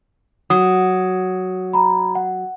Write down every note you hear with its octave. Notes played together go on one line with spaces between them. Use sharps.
F#3 D#6
A#5 B5
F#5